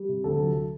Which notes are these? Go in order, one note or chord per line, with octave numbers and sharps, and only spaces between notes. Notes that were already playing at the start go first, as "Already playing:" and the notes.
Already playing: G3
C3
D2 A4
F#3